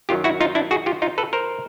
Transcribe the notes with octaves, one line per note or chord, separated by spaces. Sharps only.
F#2 D#3 F#3 F4 G4
E4 F#4
D#4 F4
D4 E4
F#4 G#4
F4 G4
D#4 F4
A4 B4
A#4 C5